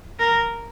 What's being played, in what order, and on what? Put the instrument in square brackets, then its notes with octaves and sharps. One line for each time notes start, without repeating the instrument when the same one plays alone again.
[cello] A#4